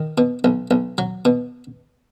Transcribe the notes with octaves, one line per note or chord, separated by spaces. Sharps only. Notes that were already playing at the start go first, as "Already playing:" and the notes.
Already playing: D#3
B2
B1
B1
F#3
B2